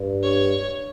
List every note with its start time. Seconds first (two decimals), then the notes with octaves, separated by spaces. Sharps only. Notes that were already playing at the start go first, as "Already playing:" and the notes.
Already playing: G2
0.23 C#5